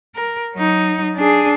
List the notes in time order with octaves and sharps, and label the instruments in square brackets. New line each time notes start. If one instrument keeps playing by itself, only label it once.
[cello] A#4
F#3 D#4
D4 G#4